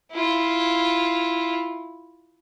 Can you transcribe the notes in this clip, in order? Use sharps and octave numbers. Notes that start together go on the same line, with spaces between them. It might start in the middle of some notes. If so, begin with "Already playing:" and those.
E4 F4